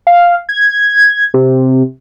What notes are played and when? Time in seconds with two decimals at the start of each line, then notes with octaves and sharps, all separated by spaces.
0.07 F5
0.49 G#6
1.34 C3